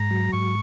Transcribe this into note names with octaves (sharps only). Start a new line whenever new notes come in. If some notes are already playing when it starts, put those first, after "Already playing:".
Already playing: G#2 A#5
F#3
G#2 C#6